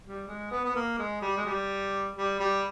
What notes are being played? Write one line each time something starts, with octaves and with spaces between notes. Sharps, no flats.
G3
G#3
B3
B3
A#3
G#3
G3
G#3
G3
G3
G3